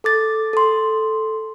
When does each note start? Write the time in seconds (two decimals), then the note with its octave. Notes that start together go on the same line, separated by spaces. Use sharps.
0.04 A4 D6 A6
0.53 A4 C6